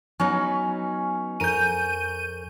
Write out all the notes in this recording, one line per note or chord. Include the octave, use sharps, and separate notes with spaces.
F#3 B3 C#4 D#4
F2 A#4 G6 D#7